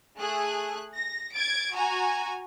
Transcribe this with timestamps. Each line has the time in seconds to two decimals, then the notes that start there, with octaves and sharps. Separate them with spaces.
0.18 A3 G#4 F#6
0.96 A#6
1.33 G#6 A6 D7
1.74 F#4 G#5 A#5